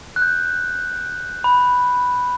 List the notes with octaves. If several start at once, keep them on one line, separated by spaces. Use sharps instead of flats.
F#6
G6
B5